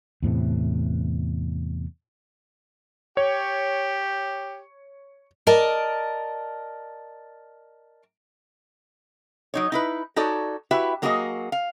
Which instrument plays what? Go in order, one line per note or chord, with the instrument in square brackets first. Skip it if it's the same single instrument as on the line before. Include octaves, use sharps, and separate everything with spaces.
[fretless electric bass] E2 A2 C3 A3
[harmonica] G4 [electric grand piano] C#5
[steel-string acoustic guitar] A#4 D5 D#5 A5
[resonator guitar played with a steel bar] F#3 D#4 C#5
D#4 E4 B4
D#4 F#4 A4 C#5 D5
E4 F#4 G4 B4 E5
F#3 A#3 F#4 G#4 A4 D#5
F5